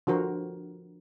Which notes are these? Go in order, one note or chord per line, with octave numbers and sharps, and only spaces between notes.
D3 F3 F#4 A#4 C5